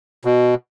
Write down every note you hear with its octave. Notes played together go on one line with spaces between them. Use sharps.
B2